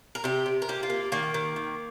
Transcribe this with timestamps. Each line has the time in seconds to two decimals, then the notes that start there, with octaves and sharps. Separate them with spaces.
0.15 A#4
0.24 C3 G4
0.46 C3
0.62 A#4
0.69 A#3 G4
0.83 F4
0.90 A#3
1.12 D#3 A#3
1.34 D#3
1.56 D#3